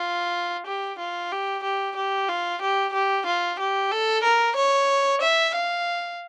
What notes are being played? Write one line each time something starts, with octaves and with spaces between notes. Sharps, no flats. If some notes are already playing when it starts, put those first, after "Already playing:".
Already playing: F4
G4
F4
G4
G4
G4
F4
G4
G4
F4
G4
A4
A#4
C#5
E5
F5